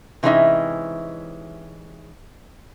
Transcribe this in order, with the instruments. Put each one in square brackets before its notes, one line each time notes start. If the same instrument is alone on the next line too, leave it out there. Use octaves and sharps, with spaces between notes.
[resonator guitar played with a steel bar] C3 E3 G#3 C#4 D#4 E5